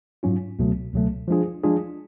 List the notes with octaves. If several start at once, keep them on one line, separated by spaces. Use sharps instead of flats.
G#2 F#3 C#4 F4
C#2 B2 F#3 A3
C#2 B2 F#3 A3
F3 G#3 D4 F4 G#4
F3 G#3 D4 F4 G#4